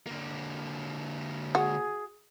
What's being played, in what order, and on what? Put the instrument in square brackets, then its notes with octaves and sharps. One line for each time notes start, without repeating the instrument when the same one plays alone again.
[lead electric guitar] D3 A#3
[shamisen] F#4 [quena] G#4